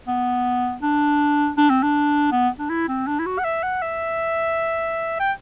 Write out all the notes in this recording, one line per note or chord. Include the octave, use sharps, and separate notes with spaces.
B3
D4
D4
C4
D4
B3
D4
E4
C4
D4
E4
F#4
F#5
E5
F#5
E5
G5